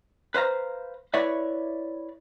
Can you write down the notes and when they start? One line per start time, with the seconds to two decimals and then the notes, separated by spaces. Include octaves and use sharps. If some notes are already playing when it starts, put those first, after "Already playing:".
0.34 B4 C5 F5 A#5
1.14 E4 B4 C#5 D5 E5